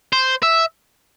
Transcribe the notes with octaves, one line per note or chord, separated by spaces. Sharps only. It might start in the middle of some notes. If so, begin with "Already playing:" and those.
C5
E5